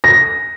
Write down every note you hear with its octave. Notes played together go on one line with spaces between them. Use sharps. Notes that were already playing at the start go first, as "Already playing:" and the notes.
A#6